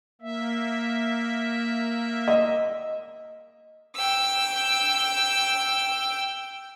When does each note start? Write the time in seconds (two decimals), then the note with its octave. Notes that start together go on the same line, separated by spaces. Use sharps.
0.21 A#3 E5
2.28 D#5
3.96 G5 E6